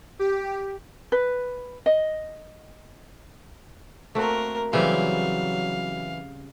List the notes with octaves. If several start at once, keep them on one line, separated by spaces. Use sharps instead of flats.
G4
B4
D#5
A3 A#3 C4 F#4 A#4
C#3 E3 F#3 G3 C4 F5